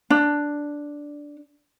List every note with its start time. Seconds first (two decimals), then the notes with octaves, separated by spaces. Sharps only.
0.10 D4